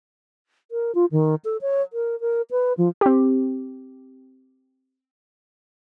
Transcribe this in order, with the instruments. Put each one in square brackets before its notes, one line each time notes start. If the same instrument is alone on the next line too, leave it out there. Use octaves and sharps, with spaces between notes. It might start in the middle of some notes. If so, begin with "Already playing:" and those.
[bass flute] A#4
F4
D#3
A4
C#5
A#4
A#4
B4
F3
[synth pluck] C4 G4